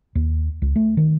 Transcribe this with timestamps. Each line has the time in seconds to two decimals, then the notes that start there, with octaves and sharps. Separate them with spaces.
0.15 D#2
0.62 C#2
0.76 A3
0.97 D#3